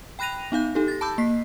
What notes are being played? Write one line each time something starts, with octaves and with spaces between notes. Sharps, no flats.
G5 B5 F#6 A#6 D#7 F7
B3 D#4 F5 G6
D#4 G4 A4
A6 A#6
A5 B5 D6 E6 G6
A#3 B6 C7